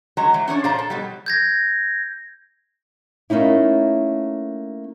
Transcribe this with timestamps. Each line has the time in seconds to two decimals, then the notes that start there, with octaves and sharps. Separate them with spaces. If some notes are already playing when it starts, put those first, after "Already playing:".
0.17 F#3 G#3 C#5 A#5
0.34 E3
0.48 C#4 D4 C#5 D5
0.64 A#2 C5 D5 F5 A5 A#5
0.79 A4
0.90 B2 F#3 G3
1.26 G6 G#6 A#6
3.30 A3 A#3 C#4 D#4 E4